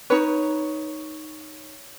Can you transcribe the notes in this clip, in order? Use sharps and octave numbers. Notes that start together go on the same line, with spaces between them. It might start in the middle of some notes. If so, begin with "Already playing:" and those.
D#4 B4 C#5